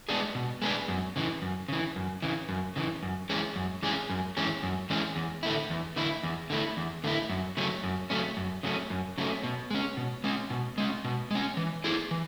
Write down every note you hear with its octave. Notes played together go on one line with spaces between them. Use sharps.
G#3 B3 D4 G#4
B2
G#3 B3 D4 G#4
F#2
C#3 E3
F#2
C#3 E3
F#2
C#3 E3
F#2
C#3 E3
F#2
E3 G#3 C#4 G#4
F#2
E3 G#3 C#4 G#4
F#2
E3 G#3 C#4 G#4
F#2
E3 G#3 C#4 G#4
E2
D3 A3 E4
E2
D3 A3 E4
E2
D3 A3 E4
E2
D3 A3 E4
F#2
C#3 F#3 A3 C#4
F#2
C#3 F#3 A3 C#4
F#2
C#3 F#3 A3 C#4
F#2
C#3 F#3 A3 C#4
B2
G#3 C#4
B2
G#3 C#4
B2
G#3 C#4
B2
G#3 C#4
E3
A3 E4 G#4
E3